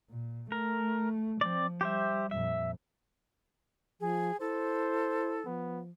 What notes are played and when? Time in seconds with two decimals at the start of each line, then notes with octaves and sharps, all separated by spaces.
0.10 A#2
0.52 A3 A#4
1.41 F3 C4 D5
1.81 G3 G4 C5 E5
2.31 F2 A#2 E5
4.01 F3 G#4
4.40 E4 A4 C5
5.46 F3 B3